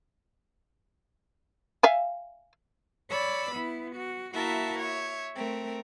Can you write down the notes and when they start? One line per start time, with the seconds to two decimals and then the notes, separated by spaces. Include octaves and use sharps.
1.83 E5 F5 G#5
3.10 C#5 D5 B5 E6
3.51 B3 E4
3.96 F#4
4.34 A#3 E4 F#4 A#4 E5 A5
4.78 C#5 E5
5.35 A3 C4 A#4